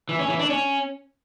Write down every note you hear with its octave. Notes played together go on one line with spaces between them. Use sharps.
E3
C#4
E3
D4
C#4